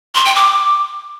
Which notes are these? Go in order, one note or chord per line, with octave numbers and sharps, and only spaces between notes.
C6
G5
D6